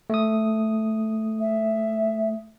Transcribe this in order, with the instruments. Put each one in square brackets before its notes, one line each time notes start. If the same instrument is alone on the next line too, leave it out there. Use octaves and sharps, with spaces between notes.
[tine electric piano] A3 D#6
[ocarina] E5